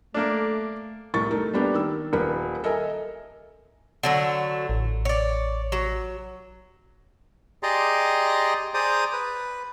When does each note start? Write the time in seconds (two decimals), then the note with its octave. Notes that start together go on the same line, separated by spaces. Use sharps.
0.14 A3 A#3 D4
1.14 C2 A2 A#4 C#6 A6
1.31 A3 D#4 A#4
1.54 G3 A#3 B3 D4 G4
1.74 D#3 E6
2.13 D#1 A#4 B4
2.64 A4 A#4 D#5 E5 G#5 A#5
4.03 D3 F#3 A3
4.69 A1
5.05 C#5 D5
5.72 F#3
7.63 G4 G#4 D5 D#5 A#5 C6
8.74 G#4 C5 D5 A#5 D#6
9.13 B4